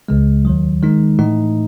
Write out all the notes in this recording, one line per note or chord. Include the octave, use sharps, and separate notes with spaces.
C#2 C#3 G#3
D#2 D#3 F#3
D#3 G#3 D#4
A2 E3 A3 D#4